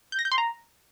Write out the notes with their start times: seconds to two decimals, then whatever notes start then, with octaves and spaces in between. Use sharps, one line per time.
0.12 G6
0.19 A#6
0.25 G6
0.32 C6
0.38 A#5